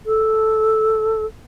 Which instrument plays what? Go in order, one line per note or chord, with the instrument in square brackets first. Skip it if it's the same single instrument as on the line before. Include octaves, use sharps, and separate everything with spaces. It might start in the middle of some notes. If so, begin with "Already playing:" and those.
[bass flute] A4